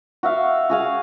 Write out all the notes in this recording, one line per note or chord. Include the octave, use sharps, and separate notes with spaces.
F#4 E5 F5
F#4 G#4 F5